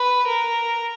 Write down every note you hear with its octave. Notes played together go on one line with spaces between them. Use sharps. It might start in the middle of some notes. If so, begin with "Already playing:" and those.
Already playing: B4
A#4